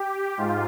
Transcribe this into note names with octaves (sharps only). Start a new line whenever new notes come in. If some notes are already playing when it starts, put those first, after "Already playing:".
Already playing: G4
G#2 F4